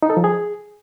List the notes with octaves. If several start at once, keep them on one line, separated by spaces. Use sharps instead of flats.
D#4
A4
F3
G#4